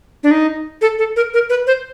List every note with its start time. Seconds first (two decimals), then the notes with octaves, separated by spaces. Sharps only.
0.23 D4
0.31 D#4
0.81 A4
0.98 A4
1.16 A#4
1.34 A#4
1.50 B4
1.67 C5